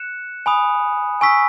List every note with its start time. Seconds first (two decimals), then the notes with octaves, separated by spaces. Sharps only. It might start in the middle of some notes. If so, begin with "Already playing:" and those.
Already playing: F#6 C#7 E7
0.46 G#5 B5 D#6
1.21 G#5 C#6 E6 B6